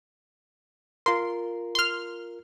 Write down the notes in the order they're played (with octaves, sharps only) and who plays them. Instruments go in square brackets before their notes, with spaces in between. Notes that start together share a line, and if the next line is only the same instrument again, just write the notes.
[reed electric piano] F4 A#4 [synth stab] C6
[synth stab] C6 F6